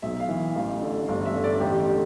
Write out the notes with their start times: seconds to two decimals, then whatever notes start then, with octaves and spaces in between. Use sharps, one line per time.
0.02 B1 E5
0.20 F5
0.29 E3
0.56 A1 F5
0.82 D3
1.07 G1 F5
1.26 E5
1.35 D3
1.44 D5
1.60 A1 G4
1.88 D3